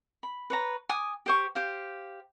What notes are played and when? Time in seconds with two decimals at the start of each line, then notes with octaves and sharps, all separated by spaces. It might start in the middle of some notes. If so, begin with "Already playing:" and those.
0.23 B5
0.50 B4 C#5 A#5
0.89 G#5 D6 D#6
1.26 G4 C5 C#6
1.55 G4 C5 F5